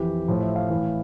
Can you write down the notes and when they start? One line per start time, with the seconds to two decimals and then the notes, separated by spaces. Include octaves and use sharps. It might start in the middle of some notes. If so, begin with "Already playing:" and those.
Already playing: F2 E3 G4
0.28 A2 F3
0.42 E5
0.56 F5
0.69 A2 E3